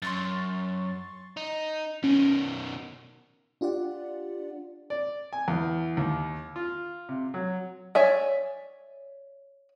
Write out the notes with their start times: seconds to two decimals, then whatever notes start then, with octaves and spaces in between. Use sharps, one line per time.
0.02 F#2 C6 C#6 A6
1.37 D#4
2.04 B2 D#3 C#4
3.61 D4 F4 G4 D5 F#5
4.90 D5
5.33 G#5
5.48 E2
5.97 D#2
6.56 F4
7.09 C3
7.34 F#3
7.95 C#5 D5 E5 G#5